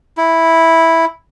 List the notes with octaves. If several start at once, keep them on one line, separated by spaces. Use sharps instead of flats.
E4